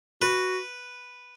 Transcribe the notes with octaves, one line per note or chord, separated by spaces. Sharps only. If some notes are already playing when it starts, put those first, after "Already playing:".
F#4 B4